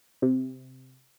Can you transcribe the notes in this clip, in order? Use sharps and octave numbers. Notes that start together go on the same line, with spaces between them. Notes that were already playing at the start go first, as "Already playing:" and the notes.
C3